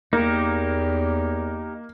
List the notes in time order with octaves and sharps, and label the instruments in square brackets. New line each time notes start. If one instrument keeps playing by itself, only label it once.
[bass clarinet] E2 [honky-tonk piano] A#3 [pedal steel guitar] D#4 G4